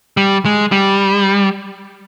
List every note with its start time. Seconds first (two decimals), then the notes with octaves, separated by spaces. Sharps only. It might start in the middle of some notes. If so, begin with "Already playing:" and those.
0.17 G3
0.45 G#3
0.72 G3